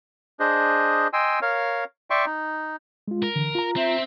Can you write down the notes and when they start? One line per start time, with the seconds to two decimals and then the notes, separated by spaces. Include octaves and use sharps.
0.40 D4 G#4 C5 D#5
1.13 D#5 G5 G#5 C6 E6
1.42 A#4 C#5 F5
2.10 D5 E5 G5 C6 C#6
2.25 D#4
3.08 G#3 F4
3.23 A#4
3.36 D3 E3
3.55 F4 A#5
3.76 C4 E5